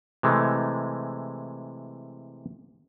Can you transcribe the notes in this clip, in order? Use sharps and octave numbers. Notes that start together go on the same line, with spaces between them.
C3 E3 G#3 A3